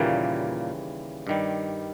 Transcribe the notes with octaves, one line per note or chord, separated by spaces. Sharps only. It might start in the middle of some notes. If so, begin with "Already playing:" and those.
Already playing: D#2 A#2 C#3 E3 G3 A#3
G2 D#3 G3